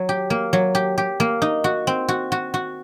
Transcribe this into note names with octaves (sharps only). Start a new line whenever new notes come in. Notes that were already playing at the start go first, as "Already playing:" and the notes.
Already playing: F#3
G4
A#3
F#3
G4
G4
A#3
D#4
F#4
C4
F#4
F#4
F#4